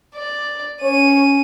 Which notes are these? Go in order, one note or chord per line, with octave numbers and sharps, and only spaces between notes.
D5
C#4 C#5 D#7